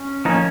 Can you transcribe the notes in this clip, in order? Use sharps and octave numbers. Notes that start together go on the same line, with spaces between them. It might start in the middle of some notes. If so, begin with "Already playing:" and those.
Already playing: C#4
F3 A#3 C#4 D#4